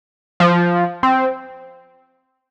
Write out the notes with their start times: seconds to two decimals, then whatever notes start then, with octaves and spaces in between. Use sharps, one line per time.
0.40 F3
1.03 C4